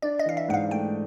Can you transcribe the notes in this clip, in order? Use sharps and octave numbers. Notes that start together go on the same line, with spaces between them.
D4 D5
D#5
E3 F5
E5
G#2 F#5
F5
A3 G5